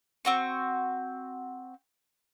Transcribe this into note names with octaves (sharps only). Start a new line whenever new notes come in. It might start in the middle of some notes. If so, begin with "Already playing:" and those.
C4 F#4 C#6